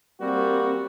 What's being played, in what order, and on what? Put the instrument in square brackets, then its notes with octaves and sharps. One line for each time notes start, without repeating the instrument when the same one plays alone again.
[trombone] G3 [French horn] A#3 [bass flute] C4 [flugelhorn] F#4